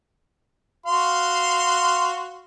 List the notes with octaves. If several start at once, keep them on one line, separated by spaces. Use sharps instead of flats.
F#4 F5 C6